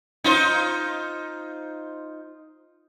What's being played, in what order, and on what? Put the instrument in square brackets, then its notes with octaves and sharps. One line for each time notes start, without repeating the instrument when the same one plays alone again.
[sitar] D#4 F4 C5